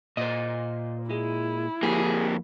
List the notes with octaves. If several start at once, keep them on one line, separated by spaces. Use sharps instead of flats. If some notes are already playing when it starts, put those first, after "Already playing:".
A#2 C5 D#5
G#3 E4
F2 A#3 G4 G#4